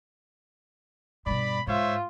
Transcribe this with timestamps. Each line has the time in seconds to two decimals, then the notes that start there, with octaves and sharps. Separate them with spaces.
1.26 G2 B2 D5 B5
1.67 G#2 F4 C5 C#5 E5